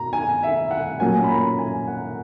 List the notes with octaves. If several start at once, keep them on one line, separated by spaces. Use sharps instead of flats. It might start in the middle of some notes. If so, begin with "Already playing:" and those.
Already playing: B2 A#5
G#5
E5
F#5
A#2 F#3 A#3 C#4 G#5
B5
A#5
G#5
F#5